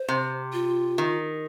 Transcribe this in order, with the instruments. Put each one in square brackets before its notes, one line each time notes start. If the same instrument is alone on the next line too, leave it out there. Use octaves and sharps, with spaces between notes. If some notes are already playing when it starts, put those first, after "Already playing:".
Already playing: [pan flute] C5
[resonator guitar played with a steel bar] C3
[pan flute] F4
[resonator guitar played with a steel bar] D#3